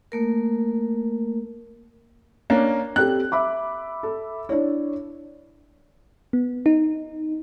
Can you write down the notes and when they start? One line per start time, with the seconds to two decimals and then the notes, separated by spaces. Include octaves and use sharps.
0.12 A3 A#3 A#4
2.50 A#3 C#4 D4
2.96 C4 G4 A4 F#6
3.32 E5 B5 D6
4.03 A4
4.49 D4 E4 C#5
6.33 B3
6.66 D#4